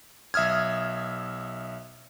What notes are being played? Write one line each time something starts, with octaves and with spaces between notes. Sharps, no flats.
B1 E5 D#6 F6 G#6